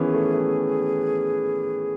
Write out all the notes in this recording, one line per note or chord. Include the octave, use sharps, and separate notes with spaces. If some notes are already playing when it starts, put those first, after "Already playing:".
Already playing: D#3 E3 B3 C#4 G#4
A3
A3